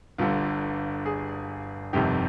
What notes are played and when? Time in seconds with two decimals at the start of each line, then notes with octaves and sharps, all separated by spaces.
0.18 G1 G2 D3 F4
1.06 G#4
1.93 G1 F2 C3 D#3 G4